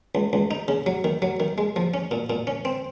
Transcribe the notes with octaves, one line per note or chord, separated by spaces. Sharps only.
C#2
C#2
D#4
C#3
F#3
D#3
F#3
D#3
G#3
F3
C#4
A#2
A#2
C#4
C4